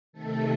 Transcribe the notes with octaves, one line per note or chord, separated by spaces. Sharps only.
C3 D#3 A3 A4